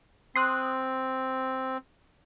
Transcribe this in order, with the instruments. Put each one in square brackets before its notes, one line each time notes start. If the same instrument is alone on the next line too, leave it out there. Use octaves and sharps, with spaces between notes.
[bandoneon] C4 [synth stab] C6 D#6 F#6